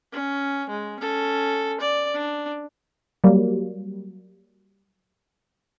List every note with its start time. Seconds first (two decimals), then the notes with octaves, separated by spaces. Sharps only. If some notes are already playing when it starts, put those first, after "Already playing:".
0.12 C#4
0.69 G#3
1.00 C#4 A4
1.80 D5
2.14 D4
3.24 F#3 G3 A#3